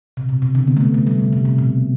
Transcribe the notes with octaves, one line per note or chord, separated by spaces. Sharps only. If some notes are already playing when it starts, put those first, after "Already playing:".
C3
B2
C3
D3
B3
A3
B3
A3
G3
C3
C3
C3
B2